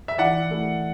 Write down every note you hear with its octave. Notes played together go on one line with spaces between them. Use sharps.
E5
E3 D5 F#5
A3 E4